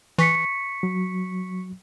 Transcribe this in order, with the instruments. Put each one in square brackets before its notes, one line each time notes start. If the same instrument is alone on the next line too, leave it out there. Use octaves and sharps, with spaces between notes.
[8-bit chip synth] E3 [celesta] C#6 B6 C#7
[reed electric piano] F#3